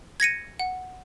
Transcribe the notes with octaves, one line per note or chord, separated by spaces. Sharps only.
G#6 A#6 C#7 D#7
F#5